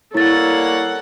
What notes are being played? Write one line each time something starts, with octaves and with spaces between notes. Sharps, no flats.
G3 A#3 E4 A4 C#5 F#5 A6